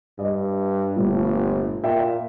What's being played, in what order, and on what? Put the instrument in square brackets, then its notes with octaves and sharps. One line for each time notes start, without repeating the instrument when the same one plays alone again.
[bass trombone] G2 [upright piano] D5 D#5
[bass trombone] G1 [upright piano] A#2 G3 A3
[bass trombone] A#2 [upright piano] D5 E5 G5